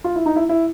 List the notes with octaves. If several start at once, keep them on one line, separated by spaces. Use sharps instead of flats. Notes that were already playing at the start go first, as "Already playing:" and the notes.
F4
E4
D#4
E4
E4